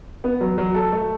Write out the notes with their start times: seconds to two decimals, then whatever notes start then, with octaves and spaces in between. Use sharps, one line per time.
0.24 B3
0.41 F#3
0.58 F#3
0.74 A4
0.92 A3